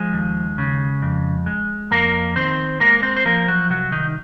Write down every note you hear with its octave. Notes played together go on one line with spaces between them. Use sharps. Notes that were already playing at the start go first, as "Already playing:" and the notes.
Already playing: F3 G#3 G#4
D#2
C#3
F2
G#3
F2 A#3 A#4
D#3 C4 C5
G#3 A#3 A#4
C4 C5
C5
F3 A#3 A#4
F#3 F#4
C2 F#3 F#4
D#3 D#4